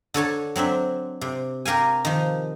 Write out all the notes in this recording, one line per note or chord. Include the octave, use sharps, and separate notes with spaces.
D3 A4 C#5 A5
F#3 C4 D4 E5
C3
G4 A#4 F5 G#5
D#3 F3